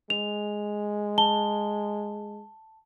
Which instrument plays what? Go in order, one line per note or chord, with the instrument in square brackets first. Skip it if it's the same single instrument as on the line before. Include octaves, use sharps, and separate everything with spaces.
[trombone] G#3 [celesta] F7
[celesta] A5 G7